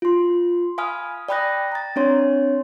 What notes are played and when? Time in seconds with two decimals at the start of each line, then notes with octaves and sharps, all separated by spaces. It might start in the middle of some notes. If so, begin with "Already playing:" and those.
0.02 F4 C6
0.78 F5 G#5 B5 D#6 F6
1.28 D5 G5 B5 D#6 F#6 A#6
1.72 A#5 A6
1.96 C4 D4 C#5 C6